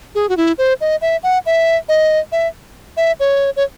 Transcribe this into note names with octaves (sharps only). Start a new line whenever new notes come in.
G#4
F#4
E4
C5
D#5
E5
F#5
E5
D#5
E5
E5
C#5
C#5